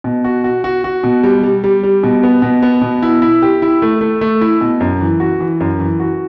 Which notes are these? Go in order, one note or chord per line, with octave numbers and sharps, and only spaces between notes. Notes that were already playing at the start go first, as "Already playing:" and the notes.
B2
F#4
F#4
F#4
F#4
B2
G3
G3
G3
G3
B2
B3
B2
B3
B2
E4
E4
G4
E4
A3
A3
A3
E4
B2
F#2
E3
F#4
E3
F#2
E3
F#4